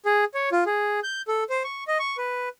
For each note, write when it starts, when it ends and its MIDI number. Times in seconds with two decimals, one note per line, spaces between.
0.06 0.25 68
0.34 0.49 73
0.52 0.64 65
0.66 1.00 68
1.04 1.22 91
1.28 1.44 69
1.50 1.63 72
1.64 1.84 85
1.88 1.98 75
1.99 2.17 85
2.18 2.49 71